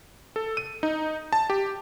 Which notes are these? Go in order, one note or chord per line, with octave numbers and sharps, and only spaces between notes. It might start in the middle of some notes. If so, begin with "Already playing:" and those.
A4
D#7
D#4
A5
G4